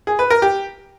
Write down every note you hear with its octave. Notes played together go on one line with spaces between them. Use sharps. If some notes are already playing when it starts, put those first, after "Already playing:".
G#4
B4
A#4
G4